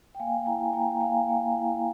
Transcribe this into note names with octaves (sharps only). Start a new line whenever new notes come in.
G5
A#3 F5 G#5
E4 G5 A#5
G#5
A#3 G5 A#5
A#5
A#3 F5 G#5
A#3
E4